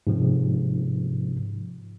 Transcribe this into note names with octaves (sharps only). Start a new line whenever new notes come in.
G#2 C3 F3